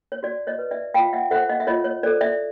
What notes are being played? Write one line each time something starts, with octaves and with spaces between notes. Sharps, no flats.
C#5
F#4 D5
C#5 D#5
B4
D5 E5
F4 F5 G5
E5 F#5
A4 C5 E5 F#5
D#5 F5
E5
F4 C#5 D#5
C#5
A4 C5 D5
D5 E5